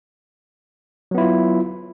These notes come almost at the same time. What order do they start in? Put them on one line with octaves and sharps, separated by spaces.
F#3 B3 E4 F4